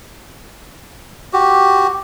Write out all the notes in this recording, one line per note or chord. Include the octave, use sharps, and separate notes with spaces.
F#4 G4